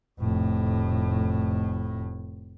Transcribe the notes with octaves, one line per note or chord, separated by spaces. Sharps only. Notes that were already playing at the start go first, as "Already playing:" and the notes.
F1 A2